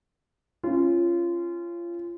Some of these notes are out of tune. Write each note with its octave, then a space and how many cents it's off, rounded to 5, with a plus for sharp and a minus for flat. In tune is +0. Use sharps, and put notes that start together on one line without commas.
C#4 -20 F4 -25